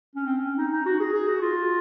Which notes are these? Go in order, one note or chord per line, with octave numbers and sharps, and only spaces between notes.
C#4
C4
C#4
D#4
D#4
F#4
G#4
G#4
F#4
F4